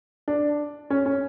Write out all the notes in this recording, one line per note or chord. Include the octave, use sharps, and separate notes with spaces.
D4
C#4
C#4